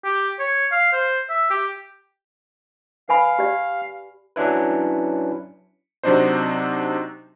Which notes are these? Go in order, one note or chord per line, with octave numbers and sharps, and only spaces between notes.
G4
C#5
F5
C5
E5
G4
B4 F5 G#5 B5
G4 D5
F#3 C#4 D4 E4 B4
C3 F#3 C4 D4 D#4 C5